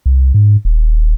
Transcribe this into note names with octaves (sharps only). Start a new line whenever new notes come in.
C2
G#2
D#1